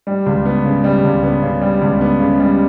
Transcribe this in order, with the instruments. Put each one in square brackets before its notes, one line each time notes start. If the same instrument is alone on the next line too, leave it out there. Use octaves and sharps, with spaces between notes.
[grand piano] G3
C#2
B3
C#3
G3
C#2
B3
C#3
G3
C#2
B3
C#3
G3